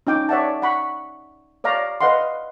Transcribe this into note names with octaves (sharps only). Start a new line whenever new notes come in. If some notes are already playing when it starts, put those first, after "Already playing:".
C#4 D#4 G5 D6
C#5 D5 E5 F#5 A5
F#5 B5 C#6
C#5 D5 F5 A#5
B4 D#5 F5 F#5 C6